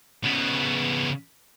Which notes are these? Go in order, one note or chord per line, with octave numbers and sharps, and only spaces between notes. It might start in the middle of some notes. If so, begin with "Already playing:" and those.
C#3 B3